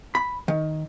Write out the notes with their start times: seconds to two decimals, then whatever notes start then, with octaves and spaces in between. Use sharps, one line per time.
0.15 B5
0.48 D#3